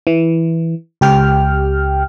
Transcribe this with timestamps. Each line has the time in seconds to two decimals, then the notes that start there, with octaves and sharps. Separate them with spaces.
0.07 E3
1.01 C#2 G4 G5 F6